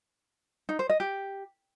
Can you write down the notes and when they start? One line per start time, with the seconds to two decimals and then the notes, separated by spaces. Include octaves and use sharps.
0.69 D#4
0.79 C5
0.89 D#5
1.00 G4